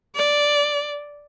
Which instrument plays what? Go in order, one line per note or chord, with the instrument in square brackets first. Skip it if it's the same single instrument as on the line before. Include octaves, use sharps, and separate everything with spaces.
[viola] D5